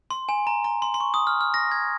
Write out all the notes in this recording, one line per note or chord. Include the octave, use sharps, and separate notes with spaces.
C6
G#5
A#5
A#5
C6
C6
C#6
D#6
F6
F6
A#6
G#6